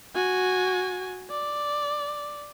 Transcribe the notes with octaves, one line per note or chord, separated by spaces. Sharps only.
F#4 G#5
D5